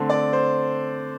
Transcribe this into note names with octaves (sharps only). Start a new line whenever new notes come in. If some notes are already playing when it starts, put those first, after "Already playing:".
Already playing: D3 A3 C4
D5
C5